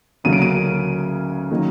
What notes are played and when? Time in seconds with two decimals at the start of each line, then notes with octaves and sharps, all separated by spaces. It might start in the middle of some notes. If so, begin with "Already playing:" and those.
0.24 D2 C#3 F#3 A#3 D#7
0.33 D7
0.42 D#7
1.51 D#3 F#3 A#3